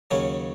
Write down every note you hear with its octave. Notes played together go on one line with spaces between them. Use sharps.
D#2 C#3 F#3 C#4